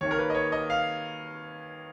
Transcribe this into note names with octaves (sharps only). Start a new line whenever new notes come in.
D#2 D#3 A#3 C#5
A#4
B4
D#5
C#5
D#5
F5